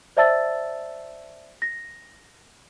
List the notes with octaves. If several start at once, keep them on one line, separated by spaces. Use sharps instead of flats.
C5 D5 E5 A5 E6 A6
A#6